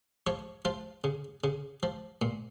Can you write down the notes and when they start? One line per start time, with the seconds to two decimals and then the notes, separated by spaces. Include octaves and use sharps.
0.27 F3 C#5
0.65 F3 F4
1.04 C#3
1.44 C#3
1.83 F3
2.22 A#2